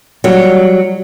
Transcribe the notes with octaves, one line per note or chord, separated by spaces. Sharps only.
F#3 G3